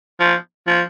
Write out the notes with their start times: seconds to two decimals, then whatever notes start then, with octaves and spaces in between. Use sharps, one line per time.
0.20 F3
0.67 F3